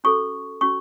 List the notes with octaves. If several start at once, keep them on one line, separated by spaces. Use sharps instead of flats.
C#4 F#4 A4 C#6
C#4 F#4 C#6